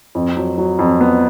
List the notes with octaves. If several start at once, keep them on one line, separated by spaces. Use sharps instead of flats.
F2
F#3
F#3
F2
B3